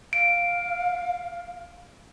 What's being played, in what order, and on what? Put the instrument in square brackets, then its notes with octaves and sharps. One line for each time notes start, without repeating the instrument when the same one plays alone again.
[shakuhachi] F5 [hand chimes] D7